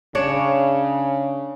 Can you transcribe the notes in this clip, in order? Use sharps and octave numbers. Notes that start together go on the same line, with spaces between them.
C#3 D4 C#5